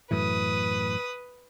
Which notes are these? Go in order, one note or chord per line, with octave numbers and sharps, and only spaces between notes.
F#2 A2 E3 B4 D#6